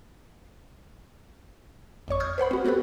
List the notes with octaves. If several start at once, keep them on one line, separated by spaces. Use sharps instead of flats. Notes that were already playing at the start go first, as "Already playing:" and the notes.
G#1 F2 C#5 C#6
D#6 F6 G6 G#6
B4 C5 F#5 B5
C4 F#4
B3 F#4 G4 A4 B4